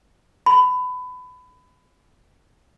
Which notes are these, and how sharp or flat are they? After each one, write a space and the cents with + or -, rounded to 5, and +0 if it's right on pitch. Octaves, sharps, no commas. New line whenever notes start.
B5 +25